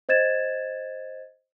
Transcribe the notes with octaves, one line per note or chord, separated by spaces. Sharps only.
C5 D#5 G#6 A6 E7